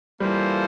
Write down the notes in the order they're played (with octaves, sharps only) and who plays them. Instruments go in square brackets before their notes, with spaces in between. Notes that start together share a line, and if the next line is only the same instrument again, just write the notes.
[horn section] E3 A#3 F4 A4 C5 [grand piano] G3